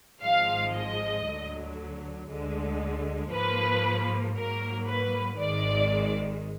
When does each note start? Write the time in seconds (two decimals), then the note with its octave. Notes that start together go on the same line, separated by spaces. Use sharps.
0.22 G#1 G#2 F3 G#3 F5
0.73 D#5
1.25 D2 D3 F#3
2.28 D2 D3 G#3
3.32 G#2 F3 A#3 B4
4.35 G#2 F#3 A#3 A#4
4.87 B4
5.39 G#1 G#2 D#3 G#3 D5